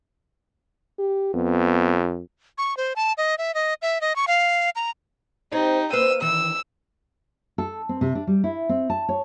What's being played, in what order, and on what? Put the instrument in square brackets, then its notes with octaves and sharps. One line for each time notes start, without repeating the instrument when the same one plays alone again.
[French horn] G4
[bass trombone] F2 [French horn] B3
[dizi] C#6
C5
A5
D#5
E5
D#5
E5
D#5
C#6
F5
A#5
[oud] C4 C#5 [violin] D#4 G4
[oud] A#3 B4 C5 [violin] E6 D#7
[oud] D#3 E3 [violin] E6
[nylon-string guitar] A4
C4
C3
D4
G3
E4
C4
A5
C#5